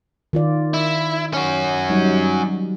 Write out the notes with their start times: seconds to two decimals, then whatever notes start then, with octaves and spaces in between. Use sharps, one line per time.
0.33 D#3 F4 D5
0.74 E4
1.33 C#4 F#4
1.90 F#3 G3 D#4